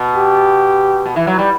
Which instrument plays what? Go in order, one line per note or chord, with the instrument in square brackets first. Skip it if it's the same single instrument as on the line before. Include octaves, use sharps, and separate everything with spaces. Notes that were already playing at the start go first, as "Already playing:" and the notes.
Already playing: [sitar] B2
[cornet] G4
[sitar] B2
E3
F#3
G3